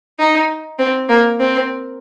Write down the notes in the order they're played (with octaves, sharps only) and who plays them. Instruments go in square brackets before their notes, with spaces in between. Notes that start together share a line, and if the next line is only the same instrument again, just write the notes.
[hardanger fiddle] D#4
C4
A#3
C4